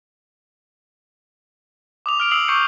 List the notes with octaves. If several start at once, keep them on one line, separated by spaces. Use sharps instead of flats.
D6 D#6 F7
F6 D7 F7
D#6 E6 C7 D7 F#7
C#6 D6 G6 C7 C#7 D#7